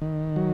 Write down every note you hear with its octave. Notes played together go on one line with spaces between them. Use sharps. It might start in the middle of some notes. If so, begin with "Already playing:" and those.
D#3
F#3